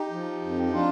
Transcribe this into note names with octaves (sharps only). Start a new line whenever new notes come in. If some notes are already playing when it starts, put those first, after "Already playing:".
Already playing: D#4 G4
F3
F2
G4
D4 F4